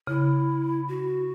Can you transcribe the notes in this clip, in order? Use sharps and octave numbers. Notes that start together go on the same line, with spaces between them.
C#3 E4
F#4